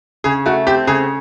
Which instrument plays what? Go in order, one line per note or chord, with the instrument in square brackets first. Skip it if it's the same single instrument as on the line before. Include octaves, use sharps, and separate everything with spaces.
[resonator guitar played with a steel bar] C#3 [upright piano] G#4
[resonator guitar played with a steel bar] A3 [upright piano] F#4
[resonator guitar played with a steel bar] C4 [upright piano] G4
[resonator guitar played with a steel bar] C#3 [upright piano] G#4